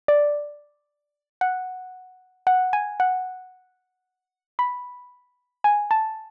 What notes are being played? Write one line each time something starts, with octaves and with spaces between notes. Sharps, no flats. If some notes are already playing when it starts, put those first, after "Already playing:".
D5
F#5
F#5
G#5
F#5
B5
G#5
A5